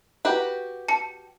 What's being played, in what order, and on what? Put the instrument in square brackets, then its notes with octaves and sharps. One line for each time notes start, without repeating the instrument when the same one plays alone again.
[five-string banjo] F#4 G4 B4
[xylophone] A5 C#7